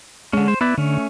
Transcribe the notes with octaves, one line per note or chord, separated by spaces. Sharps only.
D3 G#3 C#4
C5
B3 E4 B4 D5
D3 A3 C#4